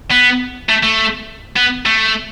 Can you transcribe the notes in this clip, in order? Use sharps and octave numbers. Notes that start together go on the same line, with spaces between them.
B3
A3
A3
B3
A3